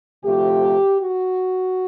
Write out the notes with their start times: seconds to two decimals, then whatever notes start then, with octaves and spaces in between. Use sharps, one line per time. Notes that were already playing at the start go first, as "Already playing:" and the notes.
0.23 D2 C3 F3 A3 G4
1.01 F#4